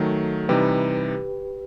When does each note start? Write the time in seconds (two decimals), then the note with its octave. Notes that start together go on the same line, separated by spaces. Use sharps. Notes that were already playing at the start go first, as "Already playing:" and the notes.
Already playing: D#3 F#3 A3 F#4 A4
0.49 C3 E3 G3 D#4 G4 B4